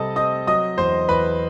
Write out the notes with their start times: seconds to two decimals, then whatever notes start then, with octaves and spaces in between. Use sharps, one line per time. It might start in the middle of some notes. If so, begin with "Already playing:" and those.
Already playing: C3 G3 A4 D#5 A5 D#6
0.16 C4 D#5 D#6
0.47 F#3 D#5 D#6
0.78 E2 C5 C6
1.09 E2 B4 B5